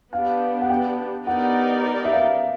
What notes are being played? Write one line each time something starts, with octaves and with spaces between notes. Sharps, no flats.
B3 D4 G4 F5
F#5
G5
B3 D#4 G4 A#4 D5 F#5
E5
F5